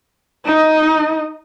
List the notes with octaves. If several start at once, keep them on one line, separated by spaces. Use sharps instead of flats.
D#4 D#5